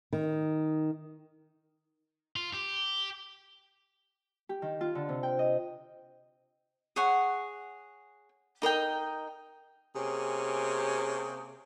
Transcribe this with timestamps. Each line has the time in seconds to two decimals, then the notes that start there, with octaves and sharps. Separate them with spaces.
0.13 D#3
2.36 F4
2.53 G4
4.49 G4
4.62 D#3
4.81 F4
4.95 D3
5.09 C3
5.23 G5
5.39 D#5
6.96 G#4 C#5 F#5
8.62 D#4 A#4 D#5 G5
9.95 C3 A#3 C#4 G4 G#4